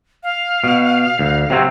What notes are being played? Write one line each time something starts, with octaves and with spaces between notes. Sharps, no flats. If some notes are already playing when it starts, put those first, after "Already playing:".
F5
B2
D2
C3 F#3 C4